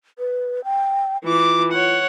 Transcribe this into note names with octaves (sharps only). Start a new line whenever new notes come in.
B4
G5
E3 F4 D6
C#5 F#5